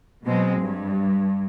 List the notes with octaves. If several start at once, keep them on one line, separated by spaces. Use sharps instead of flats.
B2 F#3 G#3 C4
G2